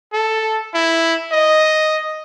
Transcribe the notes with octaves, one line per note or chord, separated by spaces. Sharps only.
A4
E4
D#5